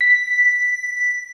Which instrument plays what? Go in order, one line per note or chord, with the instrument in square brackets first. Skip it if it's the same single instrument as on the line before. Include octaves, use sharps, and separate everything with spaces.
[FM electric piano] B6